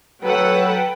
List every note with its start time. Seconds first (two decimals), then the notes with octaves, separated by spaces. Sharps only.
0.24 F#3 A4 B4 F#5 G5